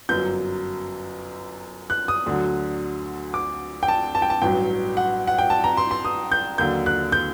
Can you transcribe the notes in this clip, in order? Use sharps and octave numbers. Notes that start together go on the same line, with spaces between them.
G1 F#2 F#3 G6
F#6
D#6
D2 D3 F#3
D6
G5
A5
A5
G5
A5
A1 G2 F#3 G5
F#5
F#5
G5
A5
A#5
C6
C6
D#6
G6
D#2 D3 F#3 G6
F#6
G6